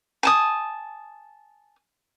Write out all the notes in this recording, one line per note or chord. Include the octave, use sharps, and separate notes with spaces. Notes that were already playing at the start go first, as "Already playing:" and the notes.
G#5 A5 D#6